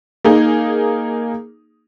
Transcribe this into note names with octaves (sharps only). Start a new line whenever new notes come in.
A#3 D#4 G#4